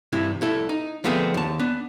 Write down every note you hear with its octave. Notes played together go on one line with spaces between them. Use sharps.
G2 C3 E3 E4
C2 E4 A4
D#4
D3 F3 A3 B3 C4 G#4
D#2 A5
B3 D4